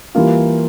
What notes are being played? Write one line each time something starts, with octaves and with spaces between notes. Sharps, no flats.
E3 G3 A#3 F4